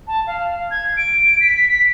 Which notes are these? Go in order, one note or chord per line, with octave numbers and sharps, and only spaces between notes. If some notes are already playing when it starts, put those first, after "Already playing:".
A5
F5
G#6
D7
B6
B6